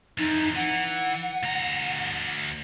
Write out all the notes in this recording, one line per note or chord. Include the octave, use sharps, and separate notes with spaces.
F2 E3 D#4
E3 F#5
D2 A#5